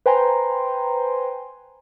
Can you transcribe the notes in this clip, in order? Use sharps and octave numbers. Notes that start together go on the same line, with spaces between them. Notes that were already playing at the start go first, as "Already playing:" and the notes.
B4 C5 G5 G#5 A#5 C6